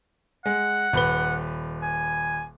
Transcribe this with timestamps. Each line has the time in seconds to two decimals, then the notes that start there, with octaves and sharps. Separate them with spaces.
0.46 G#3 F#5
0.93 D#1 B4 G7
1.82 G#5